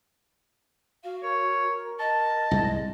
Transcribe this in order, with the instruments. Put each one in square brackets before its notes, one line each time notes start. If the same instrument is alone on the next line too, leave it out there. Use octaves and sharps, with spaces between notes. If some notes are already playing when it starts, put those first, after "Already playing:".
[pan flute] F#4 [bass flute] F5
[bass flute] A#4 [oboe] C#5
[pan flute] D#5 [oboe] A5
[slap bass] C2 G#2 [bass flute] G#3